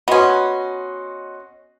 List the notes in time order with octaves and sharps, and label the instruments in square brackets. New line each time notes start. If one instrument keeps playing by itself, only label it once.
[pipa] B3 C#4 [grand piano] F#4 D#5 C6